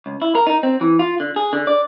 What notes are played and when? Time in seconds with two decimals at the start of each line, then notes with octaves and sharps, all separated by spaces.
0.06 C#2
0.22 E4
0.35 A#4
0.47 D#4
0.63 C4
0.81 E3
0.99 F4
1.20 D3
1.36 G#4
1.53 D3
1.67 D5